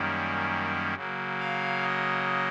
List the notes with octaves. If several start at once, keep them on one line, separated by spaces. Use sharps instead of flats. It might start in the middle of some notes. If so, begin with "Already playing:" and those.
Already playing: F#2 D#3 G3 A#3 C#4
C#3 F#3 A#3
F5
D#5